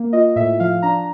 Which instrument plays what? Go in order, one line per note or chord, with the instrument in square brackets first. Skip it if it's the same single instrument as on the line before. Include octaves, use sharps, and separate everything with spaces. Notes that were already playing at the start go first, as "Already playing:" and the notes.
Already playing: [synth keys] A#3
F4 D#5
A2 E5
F3 F5
D4 A#5